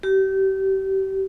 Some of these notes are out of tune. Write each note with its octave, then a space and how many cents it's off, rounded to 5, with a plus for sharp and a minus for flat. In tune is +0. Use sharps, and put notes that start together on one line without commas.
G4 -30